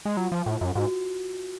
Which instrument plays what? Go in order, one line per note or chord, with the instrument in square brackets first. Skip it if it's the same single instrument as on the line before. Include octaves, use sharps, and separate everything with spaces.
[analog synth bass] G#3
[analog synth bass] F#3 [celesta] F4
[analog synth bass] F3
A2
F#2
[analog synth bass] G#2 [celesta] F#4